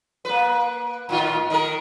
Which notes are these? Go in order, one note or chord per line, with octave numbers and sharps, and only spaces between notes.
A#3 B4
A2 D#3 F4
D#3 A#4